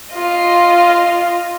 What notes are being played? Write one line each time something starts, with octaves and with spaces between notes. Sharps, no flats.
F4 D#5